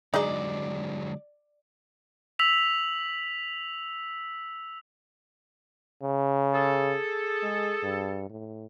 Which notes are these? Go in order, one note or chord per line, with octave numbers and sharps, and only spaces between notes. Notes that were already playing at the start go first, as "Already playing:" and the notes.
D3 F#3 G#3 D#4 G#4 D5 D#5
E6 B6 F7 F#7
C#3
G#4 A4
G#3
G2
A2